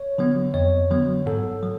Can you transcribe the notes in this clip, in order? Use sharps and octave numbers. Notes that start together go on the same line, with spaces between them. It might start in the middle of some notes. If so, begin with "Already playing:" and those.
Already playing: C#5
D3 F#3 B3
F2 C#5
D3 F#3 B3
G#2 A4
F#3